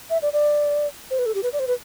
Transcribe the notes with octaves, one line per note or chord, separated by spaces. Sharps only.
E5
D5
D5
C5
B4
A4
G4
B4
D5
C5
B4